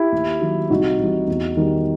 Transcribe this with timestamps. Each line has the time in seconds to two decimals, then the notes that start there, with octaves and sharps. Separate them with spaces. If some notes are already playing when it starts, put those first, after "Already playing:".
Already playing: E4 G4
0.12 D#2
0.41 D#3 F#3
0.70 C2 D#4 F#4
0.99 C3 E3 G3
1.27 E2
1.57 D#3 G3